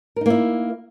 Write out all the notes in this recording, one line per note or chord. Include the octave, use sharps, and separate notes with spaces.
A#3 D#4 E4 A#4